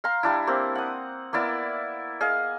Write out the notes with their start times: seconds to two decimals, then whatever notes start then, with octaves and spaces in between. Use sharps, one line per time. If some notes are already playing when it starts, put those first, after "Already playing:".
0.04 F5 A#5 C6
0.23 G3 D4 E4
0.47 A#3 C4 G4
0.75 F#5 D#6
1.33 A#3 B3 E4 D5
2.21 G#4 D#5 F5